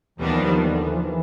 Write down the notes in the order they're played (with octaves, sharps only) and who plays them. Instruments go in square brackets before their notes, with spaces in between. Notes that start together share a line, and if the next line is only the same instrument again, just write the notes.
[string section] D#2 D#3 G3 B3 D4 [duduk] E3
[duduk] F3
F3
E3
D3
E3
F3
E3